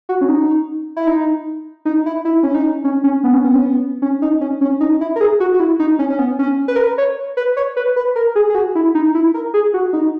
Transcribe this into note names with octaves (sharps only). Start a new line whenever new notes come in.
F#4
C#4
D#4
E4
D#4
D#4
E4
E4
C#4
D#4
C#4
C#4
B3
C#4
B3
C#4
B3
C#4
D#4
C#4
C#4
D#4
E4
A#4
G#4
F#4
F#4
E4
D#4
C#4
C#4
B3
C#4
B4
A#4
B4
C#5
B4
C#5
B4
B4
A#4
G#4
G#4
F#4
E4
D#4
E4
A#4
G#4
F#4
D#4